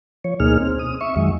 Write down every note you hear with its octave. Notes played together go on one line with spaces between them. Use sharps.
F3 C#5
D2 B2 A#3 D#4 G#4 F6
C4
D#6
E5 C#6
F2 D#3 F#3 G#3